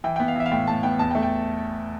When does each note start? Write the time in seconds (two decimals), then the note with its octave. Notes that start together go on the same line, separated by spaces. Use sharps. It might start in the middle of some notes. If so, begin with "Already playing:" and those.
0.04 E3 G5
0.16 B3 G5
0.28 F5
0.36 E3 E5
0.46 F5
0.52 A2 G5
0.67 A2 A5
0.83 B3 G5
0.99 E2 A5
1.11 G5
1.15 A3
1.23 G5